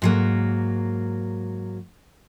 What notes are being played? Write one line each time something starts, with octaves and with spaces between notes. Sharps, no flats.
G#2 F#3 A#3